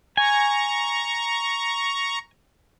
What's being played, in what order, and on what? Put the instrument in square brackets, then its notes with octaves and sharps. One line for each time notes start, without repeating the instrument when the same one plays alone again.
[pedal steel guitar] G#5 [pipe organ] A#5 C#6